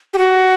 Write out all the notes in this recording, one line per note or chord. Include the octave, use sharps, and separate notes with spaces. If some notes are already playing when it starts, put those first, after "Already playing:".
G4
F#4